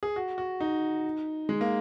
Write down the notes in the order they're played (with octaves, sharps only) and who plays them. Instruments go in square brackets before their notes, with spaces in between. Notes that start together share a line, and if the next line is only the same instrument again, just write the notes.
[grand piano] G#4
F#4
F#4
D#4
G#3
A#3